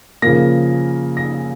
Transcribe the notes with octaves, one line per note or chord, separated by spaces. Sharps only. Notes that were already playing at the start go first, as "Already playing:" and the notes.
C#3 F3 A#3 A#6
A#6